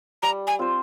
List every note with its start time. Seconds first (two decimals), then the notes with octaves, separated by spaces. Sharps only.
0.23 G3 A#5
0.47 G#5
0.59 C4 F4 C5